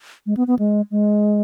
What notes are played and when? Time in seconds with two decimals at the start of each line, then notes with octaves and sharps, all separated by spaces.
0.26 G#3
0.37 B3
0.47 B3
0.59 G#3
0.91 G#3